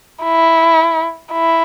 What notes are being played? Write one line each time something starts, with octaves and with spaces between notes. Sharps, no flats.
E4
E4